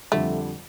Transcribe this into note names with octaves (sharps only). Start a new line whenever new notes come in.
F2 D3 G3 A3